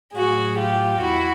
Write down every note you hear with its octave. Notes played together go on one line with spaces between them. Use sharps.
A2 F#3 F#4 G#4
F4 G4
E2 E4 F#4